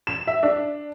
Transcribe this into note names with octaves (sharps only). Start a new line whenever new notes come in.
E7
E5
D4